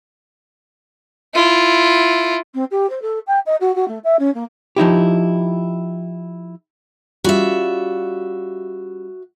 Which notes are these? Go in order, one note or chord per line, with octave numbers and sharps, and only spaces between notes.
E4 F4
C4
G4
C5
A4
G5
D#5
F#4
F#4
A3
E5
C#4
A#3
F3 D#4 E4 G4
G3 C#4 F4 F#4 E5